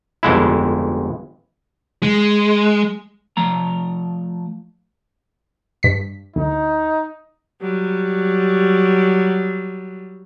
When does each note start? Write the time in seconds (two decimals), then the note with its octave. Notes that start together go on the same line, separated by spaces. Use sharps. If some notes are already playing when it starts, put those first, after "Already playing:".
0.23 G1 F2 G#3 E4
2.03 G#3
3.37 F3 A3 A#5
5.83 G2 B6
6.36 D2 D#4
7.61 F#3 G3